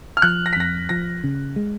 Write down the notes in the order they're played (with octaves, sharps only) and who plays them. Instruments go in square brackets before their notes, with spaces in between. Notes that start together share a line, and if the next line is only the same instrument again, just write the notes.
[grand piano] F6
[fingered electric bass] F3 [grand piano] F#6
[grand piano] A#6
B6
[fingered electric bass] F2 [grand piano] A#6
[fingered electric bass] F3 [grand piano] A#6
[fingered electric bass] C#3
G#3